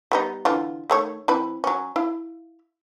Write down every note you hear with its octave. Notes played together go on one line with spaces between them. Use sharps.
G3 B3 D#4
D3 E3 F4
D#3 A3 C#5
E3 C4 B4
F#3 C#4
E4 F5